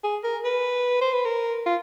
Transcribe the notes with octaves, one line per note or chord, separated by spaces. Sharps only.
G#4
A#4
B4
C5
B4
A#4
F4